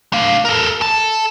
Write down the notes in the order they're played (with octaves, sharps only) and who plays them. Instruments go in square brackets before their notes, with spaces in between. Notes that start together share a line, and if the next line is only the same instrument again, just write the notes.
[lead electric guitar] D4 F5
A4 A#4
A4 A5